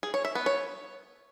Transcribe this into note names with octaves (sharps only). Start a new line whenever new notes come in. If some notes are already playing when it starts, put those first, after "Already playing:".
G#4
C#5
E5
B3
C#5